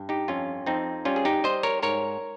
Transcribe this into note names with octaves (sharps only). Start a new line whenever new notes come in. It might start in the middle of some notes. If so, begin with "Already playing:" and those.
Already playing: G2
D#4 G4
F2 C#4 F4
F2 C4 D#4
G3 C#4 F4
G#4
D#4 G4
G3 C5 D#5
A#4 C#5
G#2 A#4 C#5